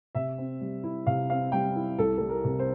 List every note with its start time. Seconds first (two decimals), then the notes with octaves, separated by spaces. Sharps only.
0.15 C3 E5
0.38 C4
0.61 G3
0.83 E4
1.07 C3 F5
1.30 C4 F5
1.52 G3 G5
1.76 E4
1.98 C2 A4
2.17 G3 A4
2.29 A#4
2.44 C3
2.59 C5